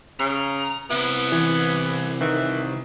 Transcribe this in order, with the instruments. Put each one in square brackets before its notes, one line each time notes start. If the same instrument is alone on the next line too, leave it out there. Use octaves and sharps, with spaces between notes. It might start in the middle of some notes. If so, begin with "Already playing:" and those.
[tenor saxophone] C#3 [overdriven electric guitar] A#5
[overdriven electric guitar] C3 E4 [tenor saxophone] B3
[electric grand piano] E3
[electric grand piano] D#3 [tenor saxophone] E3